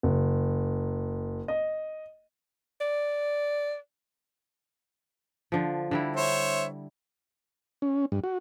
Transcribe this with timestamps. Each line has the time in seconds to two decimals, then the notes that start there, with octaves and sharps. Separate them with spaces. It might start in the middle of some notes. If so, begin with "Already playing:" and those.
0.03 F#1
1.48 D#5
2.81 D5
5.52 D3 F3
5.91 D3 G3 E4
6.16 C5 C#5 E5
7.82 C#4
8.12 G2
8.24 F#4